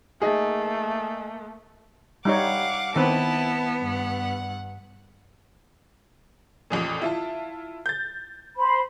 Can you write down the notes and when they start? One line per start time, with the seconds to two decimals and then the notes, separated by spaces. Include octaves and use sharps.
0.22 A3 A#3 D#4 G#4
2.25 G3 D#4 C#5 F5 F#5 D6
2.96 D#3 B3 C4 E4 B4 A5
3.81 G2 F#5
6.70 A1 F2 A#2
7.02 E4 F4 A5
7.86 G6 A6
8.57 C5 B5